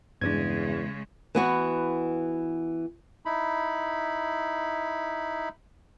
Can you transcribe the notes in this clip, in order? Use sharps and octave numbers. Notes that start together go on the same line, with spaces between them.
E2 G2 C#3 G#3 C4 D4 G#6
E3 B3 F#4
D#4 E4 B5